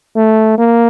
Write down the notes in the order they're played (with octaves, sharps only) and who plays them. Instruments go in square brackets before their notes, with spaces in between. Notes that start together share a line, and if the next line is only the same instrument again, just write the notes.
[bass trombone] A3
A#3